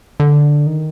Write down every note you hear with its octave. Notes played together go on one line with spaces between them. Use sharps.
D3
D#3